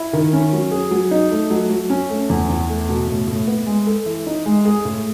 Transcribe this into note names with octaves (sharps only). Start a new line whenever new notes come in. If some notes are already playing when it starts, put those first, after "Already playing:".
Already playing: E4
D#3
C#4
F#3
G#4
F#3
D#4
A3
F#3
F#3
C#4
A3
E2
E2
A3
B2
A2
A2
B3
G#3
A4
E3
D#4
G#3
G#4
A2